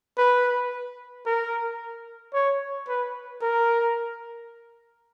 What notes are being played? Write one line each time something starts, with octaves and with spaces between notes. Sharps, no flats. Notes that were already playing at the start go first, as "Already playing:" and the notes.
B4
A#4
C#5
B4
A#4